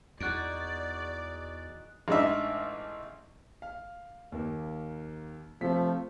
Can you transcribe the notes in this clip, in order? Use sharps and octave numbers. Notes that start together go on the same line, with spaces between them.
E2 D#4 F#4 G#4 D5 F#6 D7
A1 G#3 D4 D#4 E5
F5
D#2 A#3
C3 F3 A3 B6